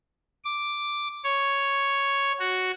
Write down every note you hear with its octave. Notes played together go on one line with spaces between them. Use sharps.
D6
C#5
F#4